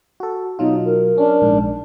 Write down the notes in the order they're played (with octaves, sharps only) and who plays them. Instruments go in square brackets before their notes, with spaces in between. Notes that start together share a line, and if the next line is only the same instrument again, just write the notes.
[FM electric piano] F#4 A4
[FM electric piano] B2 F#3 F4 [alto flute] D#4
[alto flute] A#4
[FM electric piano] C#4 [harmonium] D4
[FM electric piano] A#1 G#2